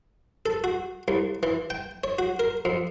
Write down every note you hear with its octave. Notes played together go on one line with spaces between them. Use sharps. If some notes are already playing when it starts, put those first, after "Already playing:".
A4
F#4
C2
E3
G5
C#5
F#4
A#4
F2